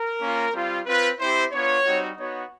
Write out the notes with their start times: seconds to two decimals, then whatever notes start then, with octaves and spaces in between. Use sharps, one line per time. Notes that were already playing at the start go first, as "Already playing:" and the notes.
Already playing: A#4
0.20 A#3 C#4 F4
0.53 G3 C4 F4
0.86 C4 F4 B4
1.19 C4 E4 G4 C5
1.52 B3 D4 F4 C#5
1.85 G3 C4 D#4 F#4
2.18 B3 D#4 F#4 C#5